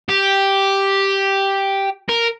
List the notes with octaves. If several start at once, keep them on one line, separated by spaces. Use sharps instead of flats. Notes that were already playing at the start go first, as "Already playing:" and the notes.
G4
A#4